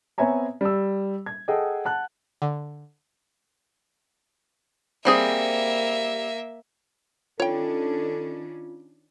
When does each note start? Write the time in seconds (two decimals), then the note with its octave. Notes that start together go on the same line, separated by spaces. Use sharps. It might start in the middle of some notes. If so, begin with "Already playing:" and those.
0.18 B3 C4 C#5 E5 G#5 A#5
0.61 G3 E6
1.26 G#6
1.48 G#4 A4 D#5 F#5 G5
1.85 F#5 A5 F#6
2.42 D3
5.05 G3 A#3 C4 G#4 E5
7.40 D#3 C#4 D4 F4 A4 C#5 G5